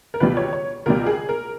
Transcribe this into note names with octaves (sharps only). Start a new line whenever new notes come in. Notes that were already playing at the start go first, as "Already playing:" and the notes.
A#4
C#2 B2 G3 B4
C#5
C#5
C#2 B2 G3 A#4
G#4
A#4